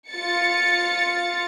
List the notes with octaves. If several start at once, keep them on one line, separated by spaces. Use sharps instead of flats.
F4 A6 C#7